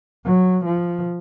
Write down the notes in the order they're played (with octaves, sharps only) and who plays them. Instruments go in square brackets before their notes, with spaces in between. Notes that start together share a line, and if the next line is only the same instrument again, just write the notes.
[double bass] F#3
F3